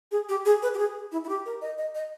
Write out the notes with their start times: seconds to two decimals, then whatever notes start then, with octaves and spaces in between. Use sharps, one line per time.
0.11 G#4
0.29 G4
0.45 G#4
0.62 B4
0.74 G4
0.78 G#4
1.12 E4
1.24 E4
1.29 G4
1.46 A#4
1.61 D#5
1.78 D#5
1.95 D#5